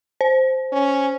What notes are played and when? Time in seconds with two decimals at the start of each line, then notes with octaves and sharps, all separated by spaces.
0.21 C5
0.72 C#4